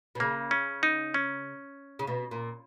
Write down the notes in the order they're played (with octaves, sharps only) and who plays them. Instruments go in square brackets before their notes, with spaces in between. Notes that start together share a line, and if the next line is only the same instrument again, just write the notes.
[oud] B2
[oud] C#3 [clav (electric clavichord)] A#3
[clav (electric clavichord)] C#4
D#4
C#4
[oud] C#3
B2
A#2